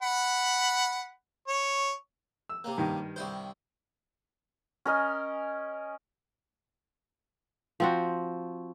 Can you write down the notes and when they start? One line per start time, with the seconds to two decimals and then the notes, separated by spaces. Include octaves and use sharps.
0.03 F#5 B5
1.48 C#5
2.49 E6
2.64 C3 A#3
2.78 G2 D#3
3.16 C2 E4 C5
4.85 C#4 A#4 D#5 G#5
7.80 F3 C4 F#4